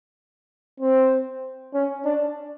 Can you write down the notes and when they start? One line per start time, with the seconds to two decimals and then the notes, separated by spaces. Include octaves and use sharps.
0.80 C4
1.74 C#4
2.05 D4